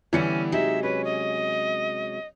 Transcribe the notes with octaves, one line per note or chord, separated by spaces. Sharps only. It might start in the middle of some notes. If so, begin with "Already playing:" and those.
D3 E3 G3 B3 C#4 E4 C#7
C3 F#3 G#3 D#4 E5
C#4 B4
D#5